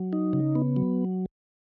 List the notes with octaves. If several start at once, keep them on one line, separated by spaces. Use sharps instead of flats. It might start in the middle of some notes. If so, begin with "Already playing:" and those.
Already playing: F#3
D#4
C#3
B3
F#3